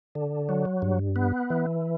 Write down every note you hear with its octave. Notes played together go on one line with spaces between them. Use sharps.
D3
F#3
G2
B3
E3